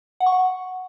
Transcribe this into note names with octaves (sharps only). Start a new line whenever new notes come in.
F#5
C#6
F#5